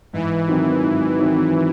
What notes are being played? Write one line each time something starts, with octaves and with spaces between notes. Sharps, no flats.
G#2 E3
D#3 F#3 C4 D#4
G#2
D#3 F#3 C4 D#4